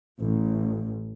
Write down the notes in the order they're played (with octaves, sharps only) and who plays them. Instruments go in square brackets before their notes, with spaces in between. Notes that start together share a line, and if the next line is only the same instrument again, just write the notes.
[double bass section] A1